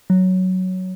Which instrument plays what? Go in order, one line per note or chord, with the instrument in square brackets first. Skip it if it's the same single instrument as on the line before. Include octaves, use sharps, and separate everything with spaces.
[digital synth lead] F#3